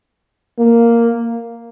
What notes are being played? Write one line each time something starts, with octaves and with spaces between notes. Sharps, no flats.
A#3